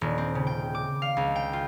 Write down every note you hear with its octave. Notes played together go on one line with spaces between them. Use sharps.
D#1
C4
C#3
G5
D6
F5
C#2
G5
F4